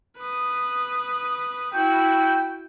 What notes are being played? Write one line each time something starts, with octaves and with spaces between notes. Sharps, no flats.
B4 D#6
E4 F#4 G5